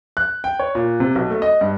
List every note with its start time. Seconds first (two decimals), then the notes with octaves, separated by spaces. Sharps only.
0.17 F#6
0.44 G5
0.59 C#5
0.75 A#2
1.00 C3
1.15 B1
1.30 A3
1.42 D#5
1.61 G2